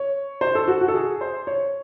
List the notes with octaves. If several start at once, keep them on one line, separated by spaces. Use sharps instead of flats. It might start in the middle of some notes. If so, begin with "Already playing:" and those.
Already playing: C#5
C5
A4
F#4
F#4
A4
G#4
C5
C#5